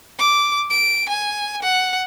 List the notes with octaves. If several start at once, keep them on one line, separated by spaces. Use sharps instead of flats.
D6
D7
G#5
F#5